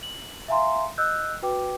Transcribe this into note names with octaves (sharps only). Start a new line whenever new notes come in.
F#7
E5 F5 G#5 A#5 C6
D#5 E6 F#6 G6
F#4 B4 G5 D6